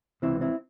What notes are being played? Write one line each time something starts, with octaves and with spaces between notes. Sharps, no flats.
C#2 C3 E3 C4 E4
C4 E4